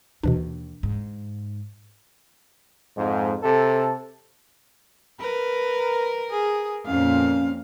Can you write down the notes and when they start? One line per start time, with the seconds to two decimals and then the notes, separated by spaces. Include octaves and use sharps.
0.23 D#2 B2 E3 D4
0.83 G#2
2.96 F2 G#2
3.43 C3 A4
5.20 A#4 B4
6.31 G#4
6.87 F2 A#2 C#4 F5